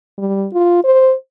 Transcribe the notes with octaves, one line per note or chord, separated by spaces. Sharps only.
G3
F4
C5